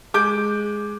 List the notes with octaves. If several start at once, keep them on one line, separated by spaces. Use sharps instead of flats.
G#3 D6 G6 D7